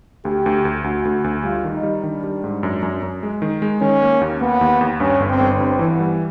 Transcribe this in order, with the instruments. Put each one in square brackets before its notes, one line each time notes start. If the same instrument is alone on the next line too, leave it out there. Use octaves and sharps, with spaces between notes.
[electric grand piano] D2 [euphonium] G4
[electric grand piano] D2
D2
[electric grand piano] D2 [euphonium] F#4
[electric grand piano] D2
D2
[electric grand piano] G3 [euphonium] F4
[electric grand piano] D#3
[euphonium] D#4
[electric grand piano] G3
[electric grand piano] D#3 [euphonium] D4
[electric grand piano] G3
G#2
F#2
F#2
F#2
G#3
D#3
G#3
[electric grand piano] D#3 [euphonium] C#4
[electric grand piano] A#3
D#2
[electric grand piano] A#3 [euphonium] B3
[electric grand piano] D#2
D#2
[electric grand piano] G2 [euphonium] C#4
[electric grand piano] G1
[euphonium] C4
[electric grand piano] G1
[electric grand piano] G2 [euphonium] C4
[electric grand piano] E3
[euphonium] B3
[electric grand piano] G3